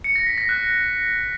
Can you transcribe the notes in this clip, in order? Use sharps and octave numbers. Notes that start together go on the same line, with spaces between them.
C#7
A#6
B6
A#6
F#6